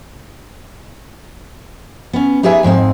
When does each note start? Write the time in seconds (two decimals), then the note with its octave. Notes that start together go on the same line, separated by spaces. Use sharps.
2.13 B3 C#4
2.43 D#4 G4 G#4 B4 E5 G#5
2.63 F2 G#2 G#3 C4